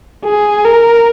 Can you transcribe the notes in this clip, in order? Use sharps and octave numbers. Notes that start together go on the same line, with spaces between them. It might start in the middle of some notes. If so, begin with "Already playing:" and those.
G#4
A#4